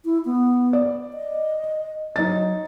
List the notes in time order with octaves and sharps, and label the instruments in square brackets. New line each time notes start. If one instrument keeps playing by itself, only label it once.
[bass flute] E4
B3
[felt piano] D5
[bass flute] D#5
[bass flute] F#3 [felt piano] D#4 A6